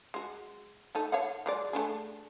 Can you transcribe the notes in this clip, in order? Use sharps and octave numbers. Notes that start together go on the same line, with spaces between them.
G#3 F#4
A3 D#4 A4
C#5 F5 F#5
F#3 G#3 D5
A3 D4 G#4